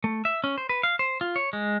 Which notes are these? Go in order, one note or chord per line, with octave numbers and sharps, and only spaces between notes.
A3
E5
C#4
C5
B4
F5
C5
F4
C#5
G#3